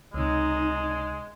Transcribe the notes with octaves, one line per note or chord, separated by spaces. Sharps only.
C#2 C3 G#3 D#4